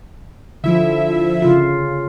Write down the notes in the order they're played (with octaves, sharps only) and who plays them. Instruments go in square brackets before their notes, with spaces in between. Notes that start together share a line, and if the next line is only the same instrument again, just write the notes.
[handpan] D3 [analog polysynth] F3 E4 E5
[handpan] C#3 F4